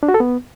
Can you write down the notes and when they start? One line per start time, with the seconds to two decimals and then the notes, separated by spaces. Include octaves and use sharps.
0.03 D4
0.09 F#4
0.14 A4
0.20 B3